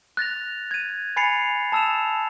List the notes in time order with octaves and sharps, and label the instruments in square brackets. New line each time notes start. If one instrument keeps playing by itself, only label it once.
[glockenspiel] F#6 A6 A#6 F7
G#6 D#7
G#5 B5 A6 C7 C#7 F7
A5 D#6 E6 A6 E7 F7